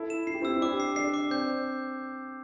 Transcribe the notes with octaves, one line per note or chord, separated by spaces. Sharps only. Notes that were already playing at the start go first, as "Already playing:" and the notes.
Already playing: E4 A4
E7
E4 C7
G4
C4 E4 E6
D4 G4 D6
C7
D4 C7
D6
C4 G6